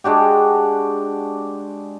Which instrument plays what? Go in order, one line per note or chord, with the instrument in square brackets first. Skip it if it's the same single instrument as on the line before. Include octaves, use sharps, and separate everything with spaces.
[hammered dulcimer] G#3 D4 F#4 G4